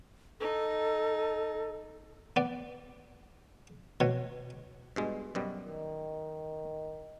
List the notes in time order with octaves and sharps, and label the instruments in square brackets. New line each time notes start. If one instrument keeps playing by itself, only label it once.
[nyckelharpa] D#4 [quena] A4
[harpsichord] B3 D5
B2 C#5
[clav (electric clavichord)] G2 B2 G#3
F#2 B2 G3
[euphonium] D#3